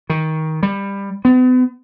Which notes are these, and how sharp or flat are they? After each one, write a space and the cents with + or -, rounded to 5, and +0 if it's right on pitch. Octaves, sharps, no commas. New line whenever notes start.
D#3 +20
G3 +20
B3 +40